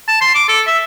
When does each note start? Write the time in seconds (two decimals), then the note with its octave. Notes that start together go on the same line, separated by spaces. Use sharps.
0.08 A5
0.21 C6
0.35 D6
0.48 A4
0.67 E5